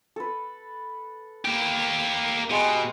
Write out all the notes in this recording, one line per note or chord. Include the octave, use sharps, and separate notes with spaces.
A4 B4
A#3 G4
B2 G3 G#3